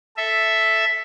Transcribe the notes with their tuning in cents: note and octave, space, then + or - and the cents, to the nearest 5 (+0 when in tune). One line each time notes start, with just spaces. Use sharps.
A4 +0 E5 +0